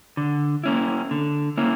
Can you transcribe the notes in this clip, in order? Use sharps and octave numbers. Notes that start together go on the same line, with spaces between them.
D3
A#3 C#4 E4
D3
A#3 C#4 E4